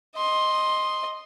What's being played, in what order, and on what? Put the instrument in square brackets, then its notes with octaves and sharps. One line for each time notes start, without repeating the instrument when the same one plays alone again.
[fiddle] D#5 C6